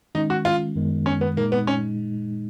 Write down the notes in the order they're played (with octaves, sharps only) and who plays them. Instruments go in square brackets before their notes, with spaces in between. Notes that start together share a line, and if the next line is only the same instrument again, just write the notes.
[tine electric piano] D#3 G#3 C#4 [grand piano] D#4
[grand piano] F#4
F4
[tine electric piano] F#2 D#3 G#3 B3
[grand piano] C#4
B3
[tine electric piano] A#2 G#3 D#4 [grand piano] A#3
[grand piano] B3
C#4